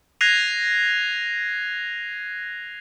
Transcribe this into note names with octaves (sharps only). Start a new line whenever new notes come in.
F#6 G#6 A#6 C7 D#7 F7